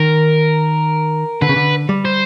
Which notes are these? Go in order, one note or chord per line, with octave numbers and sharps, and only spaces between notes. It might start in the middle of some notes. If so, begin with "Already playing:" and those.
Already playing: D#3 A#4
D3 B4
C#3
D3
G3
C5